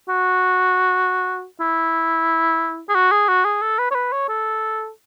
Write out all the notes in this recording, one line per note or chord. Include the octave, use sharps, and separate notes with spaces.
F#4
E4
G#4
F#4
G#4
F#4
G#4
A4
B4
C#5
B4
C#5
A4